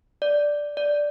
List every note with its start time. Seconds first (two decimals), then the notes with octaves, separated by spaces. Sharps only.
0.22 D5
0.77 D5